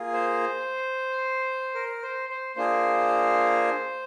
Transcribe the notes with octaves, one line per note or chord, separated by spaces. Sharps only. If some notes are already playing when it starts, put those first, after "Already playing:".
Already playing: A#3 F4 G#4
C5
A#4
C5
C5
A#3 D4 F4 G#4 C5